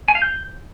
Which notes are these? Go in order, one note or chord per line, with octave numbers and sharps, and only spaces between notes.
G#5
F5
G6